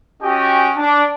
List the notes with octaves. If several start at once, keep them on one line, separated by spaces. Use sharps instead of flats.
C#4 F#4 G4 D#5 G5 G#5
D4